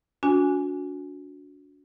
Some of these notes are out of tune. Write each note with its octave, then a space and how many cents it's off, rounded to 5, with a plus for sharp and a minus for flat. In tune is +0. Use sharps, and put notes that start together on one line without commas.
D4 -40 F#4 -30 G#5 +0